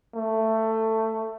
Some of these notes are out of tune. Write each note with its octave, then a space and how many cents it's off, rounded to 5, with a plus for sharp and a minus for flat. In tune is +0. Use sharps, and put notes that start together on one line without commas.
A3 +15